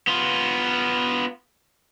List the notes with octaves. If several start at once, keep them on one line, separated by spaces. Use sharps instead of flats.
B3 F4